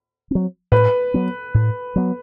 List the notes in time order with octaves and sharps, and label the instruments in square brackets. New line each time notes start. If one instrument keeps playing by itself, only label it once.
[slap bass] F#3 C4
[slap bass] A2 [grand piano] B4
[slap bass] F#3 B3
A2
F#3 B3